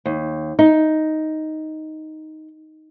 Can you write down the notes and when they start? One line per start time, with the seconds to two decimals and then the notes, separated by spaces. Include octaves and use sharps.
0.06 D#2
0.59 D#4